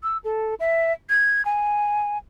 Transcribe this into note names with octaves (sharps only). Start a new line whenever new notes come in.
E6
A4
E5
G#6
G#5